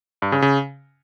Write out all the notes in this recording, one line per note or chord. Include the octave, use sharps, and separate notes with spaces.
G2
C#3
C#3